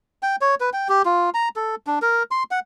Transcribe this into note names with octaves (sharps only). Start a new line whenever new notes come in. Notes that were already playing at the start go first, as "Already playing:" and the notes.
G5
C#5
B4
G5
G4
F4
A#5
A4
D4
A#4
C6
F#5